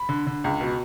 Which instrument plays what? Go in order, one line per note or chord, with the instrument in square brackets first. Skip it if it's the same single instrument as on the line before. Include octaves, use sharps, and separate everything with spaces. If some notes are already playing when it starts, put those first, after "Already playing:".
Already playing: [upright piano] B5
D3
D3
C#2
B2